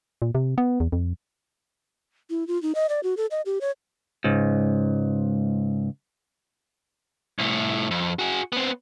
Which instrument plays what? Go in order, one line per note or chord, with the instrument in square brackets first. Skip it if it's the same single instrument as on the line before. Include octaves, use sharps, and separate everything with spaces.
[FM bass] A#2
C3
B3
E2
F2
[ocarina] E4
F4
D#4
D#5
D5
F#4
A4
D#5
G4
C#5
[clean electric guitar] C#2 G#2
[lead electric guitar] C2 A2
F2
F#4 G#4
B3 C4